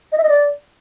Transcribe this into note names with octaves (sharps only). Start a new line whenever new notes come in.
D#5
E5
D#5
D5